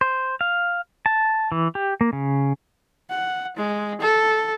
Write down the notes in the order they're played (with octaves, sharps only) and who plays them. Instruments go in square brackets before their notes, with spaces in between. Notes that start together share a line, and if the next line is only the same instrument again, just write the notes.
[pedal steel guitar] C5
F5
A5
E3
G4
A#3
C#3
[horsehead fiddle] F#5
G#3
A4